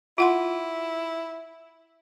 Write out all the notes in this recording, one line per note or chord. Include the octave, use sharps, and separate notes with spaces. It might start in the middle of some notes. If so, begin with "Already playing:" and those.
E4 F4 F#5 C6